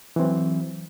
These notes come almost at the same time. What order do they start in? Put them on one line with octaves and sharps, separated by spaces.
E3 C4 F#3